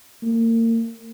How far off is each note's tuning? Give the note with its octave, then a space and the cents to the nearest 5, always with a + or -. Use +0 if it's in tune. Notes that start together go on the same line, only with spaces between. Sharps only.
A#3 -35